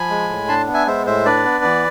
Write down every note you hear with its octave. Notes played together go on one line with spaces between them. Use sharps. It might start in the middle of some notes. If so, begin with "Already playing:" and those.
Already playing: F3 G#5 B5
G#3
A2
D4 A5 C6
B3
E5 G#5
G#3 C5 E5
A2 C5 E5
D4 B4 D5
B3
E3